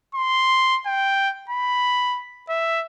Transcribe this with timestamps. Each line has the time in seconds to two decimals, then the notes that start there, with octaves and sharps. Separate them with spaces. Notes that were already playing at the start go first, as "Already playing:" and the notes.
0.15 C6
0.86 G5
1.49 B5
2.49 E5